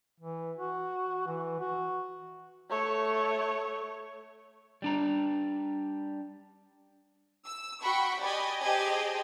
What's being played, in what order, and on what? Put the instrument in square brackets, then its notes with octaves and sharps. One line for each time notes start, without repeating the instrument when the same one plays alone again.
[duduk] E3
F#4
E3
F#4
[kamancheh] A3 C#5
[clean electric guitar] G3 D4 A#5
[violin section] E6
F#4 F#5 G5 B5 C#6
G4 D5 D#5 G#5 B5
G4 G#4 C5 D#5 G#5 A5